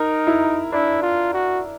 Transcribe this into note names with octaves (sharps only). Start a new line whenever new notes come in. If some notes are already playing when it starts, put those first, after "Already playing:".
Already playing: D#4 A#4
E4
D4 E4
F4
F#4